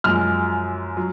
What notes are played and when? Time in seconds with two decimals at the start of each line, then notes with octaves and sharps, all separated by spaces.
0.04 F#2 F3 G#3 F6
0.97 F#3